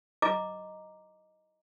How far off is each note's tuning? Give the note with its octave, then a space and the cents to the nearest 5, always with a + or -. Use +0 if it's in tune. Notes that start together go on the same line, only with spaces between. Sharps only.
D#5 +0 A#5 +0 D6 +0